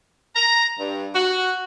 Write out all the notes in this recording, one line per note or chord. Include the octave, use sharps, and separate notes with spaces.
A#5
G2
F#4